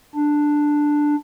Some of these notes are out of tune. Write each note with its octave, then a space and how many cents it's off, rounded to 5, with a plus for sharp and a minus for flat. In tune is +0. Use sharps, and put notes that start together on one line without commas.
D4 +5